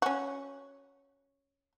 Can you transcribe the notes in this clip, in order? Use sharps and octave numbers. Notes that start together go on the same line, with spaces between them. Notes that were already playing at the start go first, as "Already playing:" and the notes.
C#4 F#4